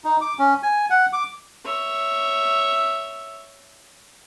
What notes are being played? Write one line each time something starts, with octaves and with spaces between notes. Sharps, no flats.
D#4
D6
C#4
G#5
F#5
D6
C#5 E5